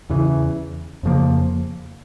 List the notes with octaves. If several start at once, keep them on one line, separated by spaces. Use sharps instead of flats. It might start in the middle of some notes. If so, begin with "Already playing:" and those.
E2 C#3 E3
F2 C#3 F3 A#3